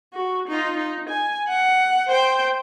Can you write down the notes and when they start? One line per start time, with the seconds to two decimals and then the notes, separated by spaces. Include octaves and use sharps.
0.13 F#4
0.48 D#4 F4
0.77 D#4
1.09 G#5
1.48 F#5
2.08 C5 G5